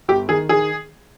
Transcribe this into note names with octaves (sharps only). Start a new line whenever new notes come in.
G1 G4
D#3 G#4
D#3 G#4